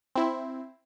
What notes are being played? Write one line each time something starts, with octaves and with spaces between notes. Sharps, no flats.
C4 E4